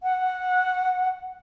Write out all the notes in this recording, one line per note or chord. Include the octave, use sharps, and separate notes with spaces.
F#5